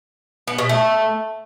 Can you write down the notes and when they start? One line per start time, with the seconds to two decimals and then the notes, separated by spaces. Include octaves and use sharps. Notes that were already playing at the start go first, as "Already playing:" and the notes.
0.48 B3
0.58 B2
0.69 A3